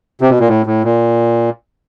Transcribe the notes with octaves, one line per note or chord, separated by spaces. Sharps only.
C3
B2
A#2
A2
A2
A#2